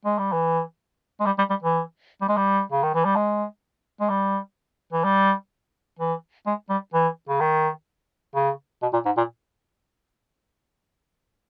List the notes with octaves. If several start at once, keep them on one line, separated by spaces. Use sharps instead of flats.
G#3
G3
E3
G#3
G3
G3
G3
E3
G3
G#3
G3
C#3
D#3
E3
G3
G#3
G#3
G3
E3
G3
E3
G#3
G3
E3
C#3
D#3
C#3
B2
A#2
G#2
A#2